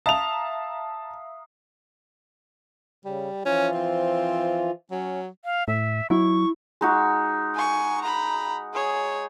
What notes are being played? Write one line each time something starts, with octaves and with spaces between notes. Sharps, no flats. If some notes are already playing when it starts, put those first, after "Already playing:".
E5 F5 A5 A#5 D#6 F7
C#3 G3
E3 F3 C#4 F4
C4
F#3 C#4
F5
A2 E5
F#3 E4 C#6
G#3 D#4 F#4
G#5 C#6
A#5 B5
G#4 C#5